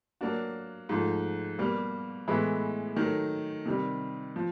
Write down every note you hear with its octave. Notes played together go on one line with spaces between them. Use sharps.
F#3 A#3 D4 F#4
G#2 F3 A3
B2 G3 A#3
A2 E3 G#3 B3 E4
D#3 F#3 A3
C3 D#3 G3
F3